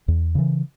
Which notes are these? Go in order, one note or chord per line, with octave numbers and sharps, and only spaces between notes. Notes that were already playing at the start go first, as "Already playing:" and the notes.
E2
C#3 E3